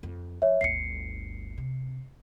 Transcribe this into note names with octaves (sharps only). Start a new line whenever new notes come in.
F2
F3 C#5 E5
G1 D2 C7 C#7
C3